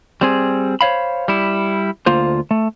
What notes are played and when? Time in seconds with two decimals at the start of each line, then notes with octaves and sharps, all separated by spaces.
0.21 G3 C4 G#4
0.81 C5 C#5 F5 B5
1.28 G3 E4
2.06 D2 A#3 F4 C5
2.51 A3